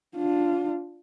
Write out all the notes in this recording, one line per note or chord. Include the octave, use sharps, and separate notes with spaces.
D4 F4